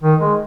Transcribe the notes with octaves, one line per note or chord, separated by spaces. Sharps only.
D#3
G#3